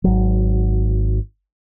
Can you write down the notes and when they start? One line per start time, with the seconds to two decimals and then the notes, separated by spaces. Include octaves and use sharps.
0.04 G#1 F#3